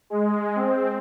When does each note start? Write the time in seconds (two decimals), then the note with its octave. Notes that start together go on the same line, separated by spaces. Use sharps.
0.10 G#3
0.56 C4